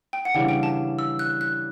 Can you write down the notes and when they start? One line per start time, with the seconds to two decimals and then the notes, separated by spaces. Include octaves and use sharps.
0.13 G5
0.25 F#5
0.34 C#3 E3 G3 D4 G5
0.48 G5
0.63 A5
0.99 E6
1.19 F#6
1.41 F#6